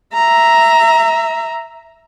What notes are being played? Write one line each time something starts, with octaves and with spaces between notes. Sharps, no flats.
E5 A#5